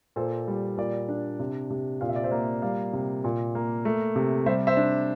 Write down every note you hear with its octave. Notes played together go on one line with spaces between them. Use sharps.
A#2 A4 C5
G3
A#2 A#4 D5
D4
C3
C3
A#2 F5
E5
D5
C5 E5
A#3
G3 D5 F5
C3
A#2
A#3
A3
C3
G3 C5 E5
C5 E5
D4